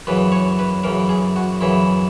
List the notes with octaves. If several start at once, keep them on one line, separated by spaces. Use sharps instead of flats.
F#2 C#3 E3 B4
C#5
B4
F#2 C#3 E3 A#4
G#4
F#4
F#2 C#3 E3 E4